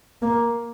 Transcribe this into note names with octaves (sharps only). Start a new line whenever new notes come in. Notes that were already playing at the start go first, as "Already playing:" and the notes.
A#3